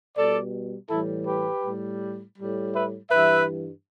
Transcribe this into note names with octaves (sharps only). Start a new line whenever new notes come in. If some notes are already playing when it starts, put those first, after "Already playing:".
B2 G3 A4 D5
A2 E3 G3 E4 A4
G4 B4
A2 G3
A2 G3
B4 E5
G2 E3 G3 B4 E5